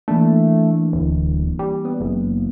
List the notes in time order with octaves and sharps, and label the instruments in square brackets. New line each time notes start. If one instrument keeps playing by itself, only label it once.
[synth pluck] E3 A#3 D4 [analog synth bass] A3
[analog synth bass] D1
G3
[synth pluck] B3
[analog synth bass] F#1